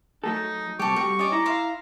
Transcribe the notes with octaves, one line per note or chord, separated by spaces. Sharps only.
F#3 A3 D#4 A4
C3 G3 G4 A4 C#6
G3 A3 F#4
C#4 D5 D#5
E4 A#5
E5 F5 C6